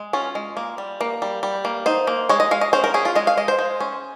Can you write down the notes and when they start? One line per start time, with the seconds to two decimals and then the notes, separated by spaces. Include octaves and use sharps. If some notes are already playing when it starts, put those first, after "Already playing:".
Already playing: G#3
0.13 C#4 F4
0.35 G#3
0.57 A#3
0.78 G3
1.01 A#3
1.22 G3
1.43 G3
1.65 A#3
1.86 D#4 C5
2.07 A#3
2.29 G#3 C#5
2.40 D#5
2.51 G#3 F5
2.61 D#5
2.73 C#4 C5
2.84 A#4
2.94 C#4 G#4
3.05 F4
3.15 G#3 D#5
3.27 F5
3.37 G#3 D#5
3.48 C5
3.59 G#3
3.80 C#4